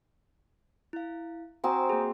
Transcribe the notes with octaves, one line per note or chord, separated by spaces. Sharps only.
E4 F5
C4 F#4 G#5 A#5 D#6
A#3 G#4